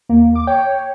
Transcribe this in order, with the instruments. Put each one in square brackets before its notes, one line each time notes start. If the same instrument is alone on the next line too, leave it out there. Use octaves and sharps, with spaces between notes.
[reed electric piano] D#2 [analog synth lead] A#3
[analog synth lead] D6
[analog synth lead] C#5 [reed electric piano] G5